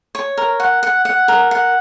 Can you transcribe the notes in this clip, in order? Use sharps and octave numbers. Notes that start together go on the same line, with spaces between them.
C#5
A#4
F#5
F#5
F#5
A#4
F#5